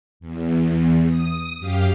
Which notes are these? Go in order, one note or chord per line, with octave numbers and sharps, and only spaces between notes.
E2
D#6
F#2 G4 F5